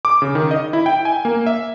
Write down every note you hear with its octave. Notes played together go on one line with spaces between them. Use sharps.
D6
C#3
D#3
D#5
E4
G5
G#5
A#3
E5